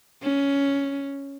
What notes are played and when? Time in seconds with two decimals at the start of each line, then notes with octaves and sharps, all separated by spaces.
0.23 C#4